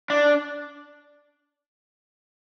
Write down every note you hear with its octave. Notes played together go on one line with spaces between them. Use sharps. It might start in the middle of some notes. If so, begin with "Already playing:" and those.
D4